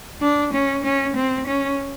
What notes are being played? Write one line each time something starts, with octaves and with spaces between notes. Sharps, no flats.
D4
C#4
C#4
C4
C#4